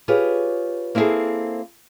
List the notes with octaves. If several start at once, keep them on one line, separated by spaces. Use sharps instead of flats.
F4 G4 G#4 B4 C#5
A#3 C4 E4 F4 G#4 A4